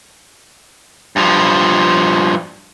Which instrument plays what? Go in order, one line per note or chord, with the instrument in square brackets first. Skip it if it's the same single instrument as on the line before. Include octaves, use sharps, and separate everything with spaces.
[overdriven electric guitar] G2 F3